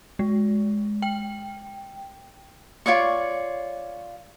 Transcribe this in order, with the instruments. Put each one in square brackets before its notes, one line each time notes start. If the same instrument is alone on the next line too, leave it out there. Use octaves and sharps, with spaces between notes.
[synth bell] G#3
G5
[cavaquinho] F4 C#5 D5 C#6